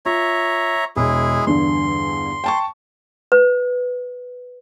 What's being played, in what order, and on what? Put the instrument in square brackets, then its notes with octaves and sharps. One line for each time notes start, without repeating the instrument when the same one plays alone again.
[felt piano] F4 [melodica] C#5 E5 A#5
[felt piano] E1 [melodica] G#3 E4 G#4
[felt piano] E2 G2 D3 [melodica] C6
[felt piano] G5 A5 C#6
[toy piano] B4